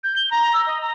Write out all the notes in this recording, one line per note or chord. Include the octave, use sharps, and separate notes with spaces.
G6
G7
A#5
E6
D#5
A#5